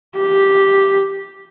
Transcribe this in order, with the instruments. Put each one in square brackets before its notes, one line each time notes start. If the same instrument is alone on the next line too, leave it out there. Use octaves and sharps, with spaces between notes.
[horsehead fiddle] G4